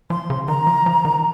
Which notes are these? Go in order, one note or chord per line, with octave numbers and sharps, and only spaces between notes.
F3 C6
C#3
D#3 A#5
F3
F3
D#3